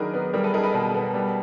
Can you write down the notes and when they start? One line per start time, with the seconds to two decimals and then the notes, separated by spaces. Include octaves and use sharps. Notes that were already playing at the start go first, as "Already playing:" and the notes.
Already playing: D#3 F#3 D4 G#4 A#4 B4
0.14 B3
0.33 G3 G#4 A#4
0.44 A4 B4
0.54 D#4 G#4 A#4
0.64 A4 B4
0.74 B2
0.94 B3
1.14 G3